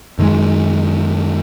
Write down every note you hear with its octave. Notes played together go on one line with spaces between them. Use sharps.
F#2 D#3 G#3